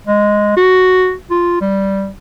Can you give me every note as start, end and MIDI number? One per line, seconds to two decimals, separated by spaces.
0.07 0.56 56
0.56 1.14 66
1.31 1.56 65
1.61 2.10 55